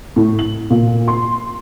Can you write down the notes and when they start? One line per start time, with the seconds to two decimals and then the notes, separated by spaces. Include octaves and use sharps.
0.16 A2
0.39 F#7
0.70 A#2
1.08 C6